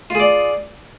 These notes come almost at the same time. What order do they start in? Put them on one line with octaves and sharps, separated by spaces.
F4 G#4 D5